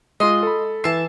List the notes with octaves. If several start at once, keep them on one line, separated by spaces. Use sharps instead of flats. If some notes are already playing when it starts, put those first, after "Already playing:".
G#3 F4 D#5 C6
A4 B5
E3 E5 A5 C7